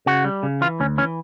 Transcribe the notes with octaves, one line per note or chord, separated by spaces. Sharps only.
C#3 F#4
G3
C#3
E3 F4
D2 C#4
E3 C#4